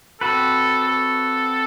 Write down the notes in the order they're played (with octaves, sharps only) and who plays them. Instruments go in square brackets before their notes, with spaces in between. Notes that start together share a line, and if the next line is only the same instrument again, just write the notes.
[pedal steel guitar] C4 F#4 B4 [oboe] A4
[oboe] A4